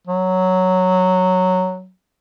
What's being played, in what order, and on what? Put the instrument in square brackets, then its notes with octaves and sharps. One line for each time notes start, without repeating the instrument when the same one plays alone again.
[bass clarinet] F#3